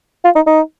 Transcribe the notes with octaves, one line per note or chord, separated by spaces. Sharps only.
F4
D#4
D#4